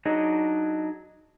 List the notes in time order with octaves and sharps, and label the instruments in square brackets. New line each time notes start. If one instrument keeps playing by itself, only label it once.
[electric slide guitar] F#3 D4 D#4 G#4 D#5